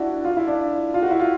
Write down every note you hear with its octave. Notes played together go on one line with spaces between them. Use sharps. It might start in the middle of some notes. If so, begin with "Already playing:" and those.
Already playing: D4 E4 F#4
F4
E4
D4
F4
F#4
E4
F4